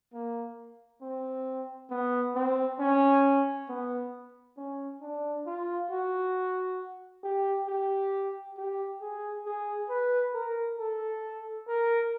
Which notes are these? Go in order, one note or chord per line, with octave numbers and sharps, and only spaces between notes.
A#3
C4
B3
C4
C#4
B3
C#4
D4
F4
F#4
G4
G4
G4
G#4
G#4
B4
A#4
A4
A#4